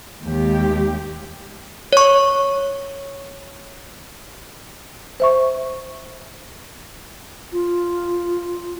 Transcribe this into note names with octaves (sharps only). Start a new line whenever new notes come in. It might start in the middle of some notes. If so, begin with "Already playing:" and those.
D#2 G#3 G4
C#5 C#6
C5 E5 C#6
F4